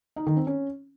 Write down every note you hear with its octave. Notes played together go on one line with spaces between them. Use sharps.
D#4
D#3
C4
C#4